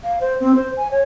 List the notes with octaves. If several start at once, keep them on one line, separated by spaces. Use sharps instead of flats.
F5
C5
C4
C5
G#5
C#5